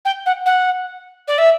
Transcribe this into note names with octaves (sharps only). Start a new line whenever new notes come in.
G5
F#5
F#5
D5
E5